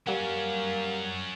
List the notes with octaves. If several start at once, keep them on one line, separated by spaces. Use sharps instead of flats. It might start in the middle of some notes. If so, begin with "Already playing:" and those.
F#3 G3 A#3 C#4 F#5